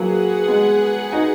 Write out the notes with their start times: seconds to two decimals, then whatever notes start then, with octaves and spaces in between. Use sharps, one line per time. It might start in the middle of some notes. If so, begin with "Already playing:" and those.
Already playing: F#3 A#3 G#4 B4 F#5
0.48 G#3 B3
1.12 D#4 F#4